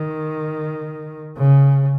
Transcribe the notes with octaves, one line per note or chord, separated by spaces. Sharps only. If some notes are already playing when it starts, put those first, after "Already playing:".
Already playing: D#3
C#3